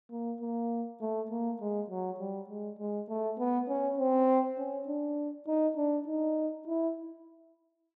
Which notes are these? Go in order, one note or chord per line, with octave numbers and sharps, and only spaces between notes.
A#3
A#3
A3
A#3
G#3
F#3
G3
G#3
G#3
A3
B3
C#4
C4
C#4
D4
D#4
D4
D#4
E4